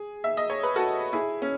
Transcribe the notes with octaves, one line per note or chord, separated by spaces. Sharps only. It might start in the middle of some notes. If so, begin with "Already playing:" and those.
Already playing: G#4
E5
D#5
C#5
B4
F#4 A4
E4 G#4
C#4